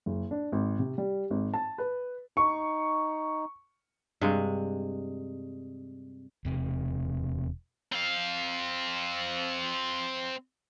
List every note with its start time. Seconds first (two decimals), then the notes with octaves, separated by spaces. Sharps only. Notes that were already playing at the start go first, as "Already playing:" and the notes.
0.06 F#1
0.31 D4
0.52 G#1
0.79 C3
0.98 G3
1.30 G#1
1.54 A5
1.78 B4
2.37 D#4 C#6
4.21 G2 C3 G#3
6.45 E1 C3
7.93 C4 F5